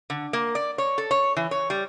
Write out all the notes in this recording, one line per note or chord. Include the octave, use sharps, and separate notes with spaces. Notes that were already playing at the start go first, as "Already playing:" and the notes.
D3
A#3
D5
C#5
A4
C#5
E3
C#5
G3